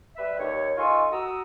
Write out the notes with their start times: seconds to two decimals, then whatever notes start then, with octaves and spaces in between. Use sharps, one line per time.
0.16 G3 B4 E5
0.37 D#2 C#5
0.77 D#4 F4 A4 G#5 C#6
1.11 F#4 A#5 D#6 E6